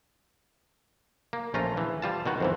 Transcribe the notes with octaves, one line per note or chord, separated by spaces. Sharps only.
A#3
A#1 A3 C#4 F4 A#5
E3
G3 F4 A5
B2 D#3 F#4
F2 G#2 E3